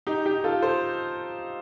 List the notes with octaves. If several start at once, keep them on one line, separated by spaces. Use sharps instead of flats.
D#4 G4
D#4 G4
F4 A4
A4 C5